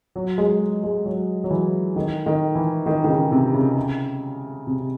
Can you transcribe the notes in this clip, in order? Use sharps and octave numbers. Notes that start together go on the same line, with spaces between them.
F#3
G#3
G#3
F#3
F#3
E3
D#3
D#3
E3
D#3
D#3
C#3
C3
C#3
C3